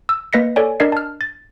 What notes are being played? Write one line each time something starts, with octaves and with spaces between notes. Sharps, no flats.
E6
A#3 B4 D#5 A#6 B6 C#7
A4 C#5 D5 G#5
D4 A#4 D5 D#5 G#6 C7
A5 F6
A6